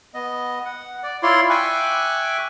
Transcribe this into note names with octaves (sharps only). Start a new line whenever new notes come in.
B3 D#5
F#5
D5
E4 F4 C#5 D5 C6
E5 G5 G#5 C#6 D6 F#6